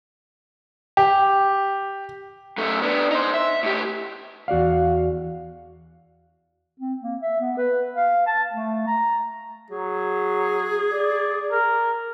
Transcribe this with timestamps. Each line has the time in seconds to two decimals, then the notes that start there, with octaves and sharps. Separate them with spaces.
0.97 G4
2.58 F#2 A3
2.82 B3 D4
3.11 D#4 C5
3.34 E5
3.63 A2 G4
4.48 E2 F#4 D5 F5
6.80 C4
7.02 A#3
7.22 E5
7.40 B3
7.58 B4
7.96 F5
8.27 A5
8.52 A3
8.87 A#5
9.70 F#3 G#4
10.92 D5
11.52 A#4